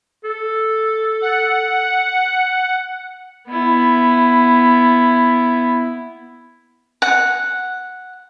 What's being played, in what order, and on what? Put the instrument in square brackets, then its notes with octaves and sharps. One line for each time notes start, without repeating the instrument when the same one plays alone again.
[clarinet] A4
[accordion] F#5
[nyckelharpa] B3 E4
[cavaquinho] F#5